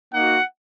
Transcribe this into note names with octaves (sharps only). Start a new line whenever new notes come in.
A#3 D#4 F#4 F#5